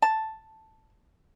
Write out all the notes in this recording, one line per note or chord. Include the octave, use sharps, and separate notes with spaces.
A5